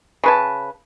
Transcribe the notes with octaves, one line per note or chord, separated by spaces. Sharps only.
C#3 B4 A5